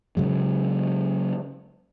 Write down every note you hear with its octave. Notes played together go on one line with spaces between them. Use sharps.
C#3 F#3 G#3